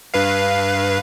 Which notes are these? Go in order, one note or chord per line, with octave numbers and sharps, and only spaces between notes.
G2 B4 F5